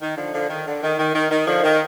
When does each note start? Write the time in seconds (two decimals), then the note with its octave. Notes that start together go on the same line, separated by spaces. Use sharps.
0.02 D#3
0.17 D3 F3
0.34 D3 F3
0.50 D#3
0.66 D3
0.83 D#3
0.99 D#3
1.15 D#3
1.31 D#3
1.47 D3 F3
1.64 D#3